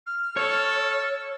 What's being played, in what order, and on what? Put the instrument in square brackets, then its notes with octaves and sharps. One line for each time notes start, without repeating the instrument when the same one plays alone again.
[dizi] F6
[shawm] A4 [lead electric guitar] C#5